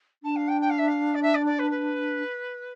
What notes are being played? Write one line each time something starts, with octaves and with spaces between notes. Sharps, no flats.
D4 A5
F5
G5
G5
F5
E5
F5
D5
E5
D5
D5
B4
B4